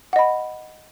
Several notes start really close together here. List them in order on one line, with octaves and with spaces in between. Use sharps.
F#5 D#5 B5